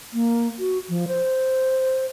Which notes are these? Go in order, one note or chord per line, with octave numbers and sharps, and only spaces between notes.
A#3
F#4
F3
C5